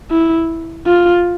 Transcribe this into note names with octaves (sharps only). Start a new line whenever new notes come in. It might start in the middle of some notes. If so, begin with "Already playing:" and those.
E4
F4